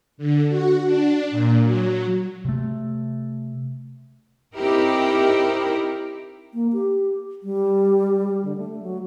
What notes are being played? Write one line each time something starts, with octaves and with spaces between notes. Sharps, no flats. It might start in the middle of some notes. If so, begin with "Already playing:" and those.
D3
F#4
D4
A#2
F#3
C3 A3
C4 D#4 E4 G4 A#4
A#3
G4
G3
G3
D3
A3
F#3